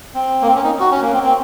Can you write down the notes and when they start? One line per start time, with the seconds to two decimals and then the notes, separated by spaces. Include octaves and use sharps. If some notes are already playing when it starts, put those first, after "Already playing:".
0.15 C4
0.42 A#3
0.47 C4
0.55 C#4
0.64 D#4
0.80 F#4
0.91 C#4
1.02 A#3
1.13 C4
1.24 C4